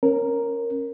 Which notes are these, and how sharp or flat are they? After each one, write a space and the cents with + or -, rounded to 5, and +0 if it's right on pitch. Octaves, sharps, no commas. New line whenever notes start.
C#4 -20 A#4 +0